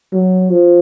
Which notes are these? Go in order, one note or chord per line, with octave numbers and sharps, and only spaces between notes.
F#3
F3